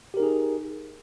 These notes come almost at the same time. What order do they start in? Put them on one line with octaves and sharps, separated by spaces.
G4 A#4 D#4 G#4